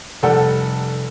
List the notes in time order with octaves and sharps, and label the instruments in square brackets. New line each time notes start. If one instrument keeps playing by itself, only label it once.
[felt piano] F1 G3 A4 F#5 G5 A5